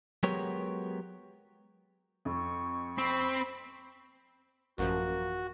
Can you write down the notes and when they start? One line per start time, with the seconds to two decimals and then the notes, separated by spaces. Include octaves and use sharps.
0.23 F#3 G#3 B3 G4 A#4 C#5
2.25 F2 C#6
2.98 C4 B5
4.78 A1 F#2 F3 A#3 F#4